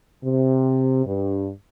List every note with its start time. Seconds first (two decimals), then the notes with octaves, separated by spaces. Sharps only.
0.24 C3
1.06 G2